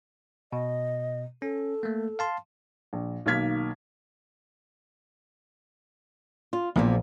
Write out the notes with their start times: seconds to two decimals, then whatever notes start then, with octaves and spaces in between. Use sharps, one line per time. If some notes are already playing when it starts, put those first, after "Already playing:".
0.52 B2 D#5
1.42 C#4 A4
1.83 A3 A#3
2.19 F5 A5 C6
2.93 A#1
3.26 B1 D#3 A#3 F6 G#6 B6
6.53 F4
6.76 A#1 E2 A#2 F3